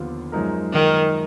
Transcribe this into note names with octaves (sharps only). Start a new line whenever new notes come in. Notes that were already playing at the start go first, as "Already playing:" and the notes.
Already playing: D#2 D3 F3 B3 F4
F#2 F3 G#3 D#4 A#4
D#3